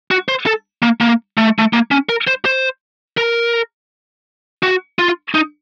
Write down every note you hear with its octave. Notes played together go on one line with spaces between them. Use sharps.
F#4
C5
A4
A#3
A#3
A3
A3
A#3
C#4
A#4
C5
C5
A#4
F#4
F4
D#4